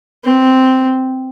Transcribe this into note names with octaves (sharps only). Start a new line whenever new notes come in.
C4